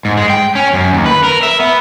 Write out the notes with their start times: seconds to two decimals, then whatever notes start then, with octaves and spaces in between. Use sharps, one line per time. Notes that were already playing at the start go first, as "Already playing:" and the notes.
0.05 G#2
0.17 G#3
0.30 G5
0.55 C#4
0.73 F#2
0.93 D#2
1.06 B4
1.23 A#4
1.43 E5
1.60 B3